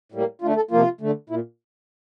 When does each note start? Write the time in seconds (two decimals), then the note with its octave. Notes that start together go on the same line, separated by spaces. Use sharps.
0.12 A2 G3 A#3
0.42 D3 A3 F4
0.56 A4
0.71 C3 F3 A#3 F4
1.01 D3 A3
1.30 A#2 E4